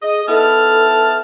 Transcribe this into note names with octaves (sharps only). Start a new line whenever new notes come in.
G#4 D#5
B3 D#4 E4 A4 A5 F6